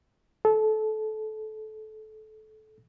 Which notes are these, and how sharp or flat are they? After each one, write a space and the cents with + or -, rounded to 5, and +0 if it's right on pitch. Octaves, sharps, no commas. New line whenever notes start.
A4 -25